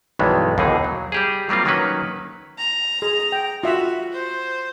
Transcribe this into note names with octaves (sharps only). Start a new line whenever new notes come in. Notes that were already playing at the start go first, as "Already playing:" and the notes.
B1 G2 D#3 E3 G#3 B3
D#2 B2 D3 E3 D#4 G#4
F#3
G3 G4 G#4
F#3 G3 A#3 C4 F4
D#3 F#3 A#3 C#4 B4
A#5
G#4
G5
F4 F#4 E5
C5